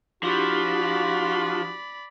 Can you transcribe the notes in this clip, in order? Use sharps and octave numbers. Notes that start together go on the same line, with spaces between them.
F3 D4 E4 F#4 G4 D5 B5